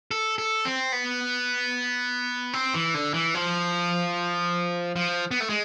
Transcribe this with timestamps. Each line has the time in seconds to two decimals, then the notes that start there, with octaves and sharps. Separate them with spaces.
0.11 A4
0.38 A4
0.65 C4
0.92 B3
2.53 C4
2.74 E3
2.94 D3
3.14 E3
3.35 F3
4.96 F3
5.31 B3
5.40 A3
5.50 G#3